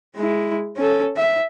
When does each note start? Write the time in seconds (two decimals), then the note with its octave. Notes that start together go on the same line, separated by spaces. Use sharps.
0.16 G#3 E4
0.77 C#4 A4
1.16 E5